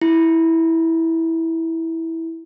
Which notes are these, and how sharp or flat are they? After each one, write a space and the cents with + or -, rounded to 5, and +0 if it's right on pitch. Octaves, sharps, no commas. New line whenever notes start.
E4 -10